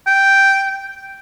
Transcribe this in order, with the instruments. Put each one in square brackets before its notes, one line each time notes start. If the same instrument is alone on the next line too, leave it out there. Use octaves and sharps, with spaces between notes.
[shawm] G5